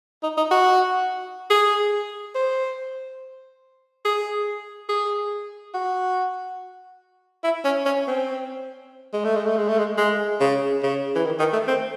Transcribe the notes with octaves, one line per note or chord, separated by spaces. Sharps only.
D#4
D#4
F#4
G#4
C5
G#4
G#4
F#4
E4
C#4
C#4
C4
G#3
A3
G#3
A3
G#3
A3
G#3
G#3
C#3
C#3
E3
D#3
D#3
A3
C4